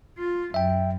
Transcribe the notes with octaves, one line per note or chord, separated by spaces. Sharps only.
F4
F#2 E5 G5